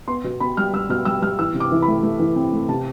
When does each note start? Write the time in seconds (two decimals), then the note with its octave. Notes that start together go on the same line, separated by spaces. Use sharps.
0.08 B3 C6
0.24 B2
0.40 B2 B5
0.57 G3 F6
0.73 G3 E6
0.89 B2 F6
1.05 G3 E6
1.22 G3 F6
1.39 E3 E6
1.54 C3
1.60 D6
1.72 E3
1.82 B5
1.88 A3
2.03 A3
2.19 E3
2.36 C4
2.53 A3
2.68 C3 A5